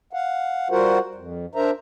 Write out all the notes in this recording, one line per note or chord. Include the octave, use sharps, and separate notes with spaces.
F5 F#5
G3 F4 F#4 A#4 C5 F#5
F2
D4 A#4 C5 E5 A#5